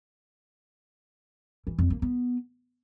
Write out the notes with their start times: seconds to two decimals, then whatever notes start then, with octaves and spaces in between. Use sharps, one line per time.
1.67 E3
1.79 F2
1.90 A#3
2.02 B3